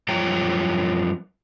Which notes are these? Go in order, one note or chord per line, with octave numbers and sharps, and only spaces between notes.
F#2 F3 G3 C#5 G5 A#5